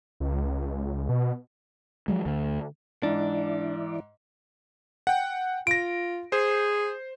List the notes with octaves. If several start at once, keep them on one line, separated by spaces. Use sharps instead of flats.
C#2
B2
F3 F#3 G#3
D2 D3
G#2 E3 D4 E4 D5
F#5 G5
F4 A#6 D7
G#4 C5